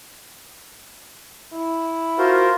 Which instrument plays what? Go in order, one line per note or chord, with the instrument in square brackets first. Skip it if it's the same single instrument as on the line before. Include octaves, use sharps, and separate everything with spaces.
[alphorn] E4
[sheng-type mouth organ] F4 A#4 C5 [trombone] F#4